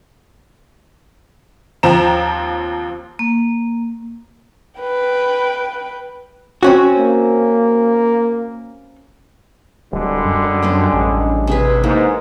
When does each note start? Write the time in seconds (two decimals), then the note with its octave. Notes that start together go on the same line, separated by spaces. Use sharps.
1.83 D#2 F3 C4 A#5 E7
3.19 A#3
4.80 B4 G5
6.63 C4 C#4 F#4
6.98 A#3
9.93 D1 D3 G3 G#3
10.25 F#2
10.63 C#4 D4 C5
10.93 A1
11.47 C3 G#4 B4
11.83 G#2 E3 A#3